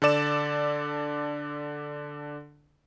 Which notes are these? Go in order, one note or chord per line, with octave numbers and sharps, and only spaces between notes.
D3 A4 D5 E7